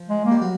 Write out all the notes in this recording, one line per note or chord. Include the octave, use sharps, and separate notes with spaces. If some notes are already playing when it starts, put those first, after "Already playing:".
Already playing: F3
G#3
A#3
G3
F#3